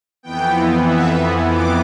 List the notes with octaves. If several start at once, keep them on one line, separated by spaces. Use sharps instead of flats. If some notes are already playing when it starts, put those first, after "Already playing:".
F2 E3 B3 G5
E5
D6